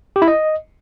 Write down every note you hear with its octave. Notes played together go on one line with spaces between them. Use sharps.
G4
E4
D#5